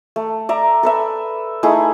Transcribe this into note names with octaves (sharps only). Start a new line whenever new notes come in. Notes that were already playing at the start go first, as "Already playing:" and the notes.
A3
D5 E5 A#5
A4 B4 E5
A3 D#4 E4 G#4